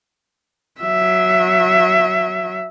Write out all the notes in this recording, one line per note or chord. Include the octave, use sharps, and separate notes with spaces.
F#3 E5